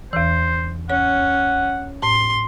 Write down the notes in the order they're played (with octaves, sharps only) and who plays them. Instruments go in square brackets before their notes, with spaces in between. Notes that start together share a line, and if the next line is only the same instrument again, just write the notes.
[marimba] E2 E3 [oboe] C5
[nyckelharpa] C#4 [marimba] C#5 [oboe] F#5
[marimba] A2 [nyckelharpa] C6